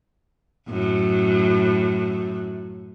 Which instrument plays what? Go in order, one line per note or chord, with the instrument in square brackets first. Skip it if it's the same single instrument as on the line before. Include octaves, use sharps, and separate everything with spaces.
[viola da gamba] F#2 A2